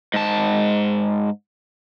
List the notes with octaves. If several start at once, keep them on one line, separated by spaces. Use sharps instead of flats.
G#2 A5